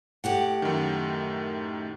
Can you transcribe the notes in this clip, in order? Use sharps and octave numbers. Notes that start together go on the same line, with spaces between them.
A2 G4 F#5
F#2 D#3